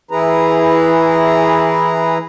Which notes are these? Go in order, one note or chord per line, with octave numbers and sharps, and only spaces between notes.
E3 E4 G#4 B4 A#5